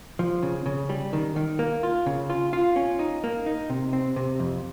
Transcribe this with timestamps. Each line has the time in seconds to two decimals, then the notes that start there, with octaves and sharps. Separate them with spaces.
0.19 F3
0.43 C#3
0.66 C#3
0.89 G3
1.13 D#3
1.36 D#3
1.59 A#3
1.83 F4
2.06 C#3
2.30 F4
2.53 F4
2.76 C#4
2.99 D#4
3.24 A#3
3.46 D#4
3.70 C3
3.93 C4
4.16 C3
4.40 F2